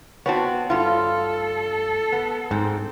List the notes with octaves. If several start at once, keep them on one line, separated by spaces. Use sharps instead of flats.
B3 C4 F#4 C#5 A5
G2 F4 A4
B3
G#2 C4